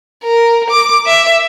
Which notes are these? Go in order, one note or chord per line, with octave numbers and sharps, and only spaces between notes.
A#4
D6
E5